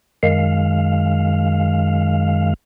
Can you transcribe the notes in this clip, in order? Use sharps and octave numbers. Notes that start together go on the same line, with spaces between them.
F#2 D#3 G#3 F5